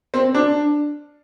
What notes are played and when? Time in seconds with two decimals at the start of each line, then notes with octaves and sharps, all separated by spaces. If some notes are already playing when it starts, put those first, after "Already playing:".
0.14 C4
0.35 D4